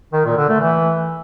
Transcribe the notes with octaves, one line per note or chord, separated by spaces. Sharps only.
D#3
A#2
D3
A3
E3